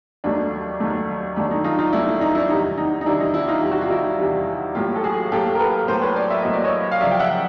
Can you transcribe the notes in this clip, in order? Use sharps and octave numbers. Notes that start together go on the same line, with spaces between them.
D#2 D#3 F#3 A3 D4
D#2 D#3 F#3 A3
D#2 D#3 F#3 A3 D4
D#4
D#4 F4
D#4 F4
D#2 D#3 F#3 A3 D4 E4
D4
D#4
D4 E4
E2 C3 D#3 G3 D#4
D#4
D#4
E2 C3 D#3 G3 D4 E4
D#4
D4 E4
D#4 F4
E2 C3 D#3 G3 G4
F#4
F4
E4 F#4
E2 C3 D#3 G3
A2 F#3 A#3 F4 G4
A4
F#4 G#4
A2 F#3 A#3 G4 A4
A#4
A4 B4
A2 F#3 A#3 A#4 C5
B4 C#5
C5 D5
E5
A2 F#3 A#3 D#5
D5
C#5 D#5
F5
F#2 C#3 F3 D5 E5
G5
E5 F#5